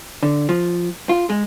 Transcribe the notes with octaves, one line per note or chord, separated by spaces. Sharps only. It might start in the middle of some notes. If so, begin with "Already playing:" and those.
D3
F3
F4
G#3